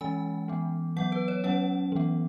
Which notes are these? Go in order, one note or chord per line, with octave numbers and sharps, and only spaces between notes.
E3 G#3 C#4 G#5
E3 B3
F#3 B3 F#5
B4
C#5
F#3 C#4 F#5
E3 B3